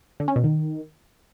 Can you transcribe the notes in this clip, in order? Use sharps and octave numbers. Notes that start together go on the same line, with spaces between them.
D3
C#4
B2
D#3